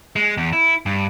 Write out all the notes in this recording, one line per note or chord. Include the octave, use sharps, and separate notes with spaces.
G#3
E2
E4
G2